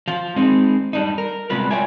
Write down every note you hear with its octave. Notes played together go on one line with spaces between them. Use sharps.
F3 F4
G#3 C4 D#4
G3 D4 D#4
A#4
C3 G3 G#3 B3 F4 B4
F4 C#5 D5 E5 G5 G#5